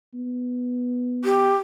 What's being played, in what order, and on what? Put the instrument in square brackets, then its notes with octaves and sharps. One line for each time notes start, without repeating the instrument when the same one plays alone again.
[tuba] B3
[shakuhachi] G4